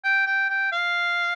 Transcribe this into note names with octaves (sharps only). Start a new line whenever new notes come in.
G5
G5
G5
F5